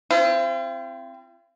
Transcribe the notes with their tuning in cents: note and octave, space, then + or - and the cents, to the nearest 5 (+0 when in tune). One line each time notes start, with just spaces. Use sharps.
C4 +0 F4 -45